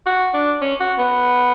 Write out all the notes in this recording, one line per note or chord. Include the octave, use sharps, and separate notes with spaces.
F#4
D4
C#4
F#4
B3